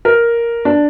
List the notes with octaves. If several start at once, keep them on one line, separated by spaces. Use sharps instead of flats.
A#4
D4